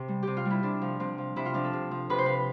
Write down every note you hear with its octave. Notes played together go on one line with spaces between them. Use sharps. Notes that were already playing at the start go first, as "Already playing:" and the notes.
Already playing: C3
G3
C3 G4
F4
G3
E4
C3 D4
F3
C3 C4
F3
C3 E4
F4
F3 D4
A4
C3
F3
C3 B4
C5
F3 B4